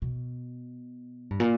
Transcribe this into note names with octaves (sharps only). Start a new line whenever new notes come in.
B2
G2
A#2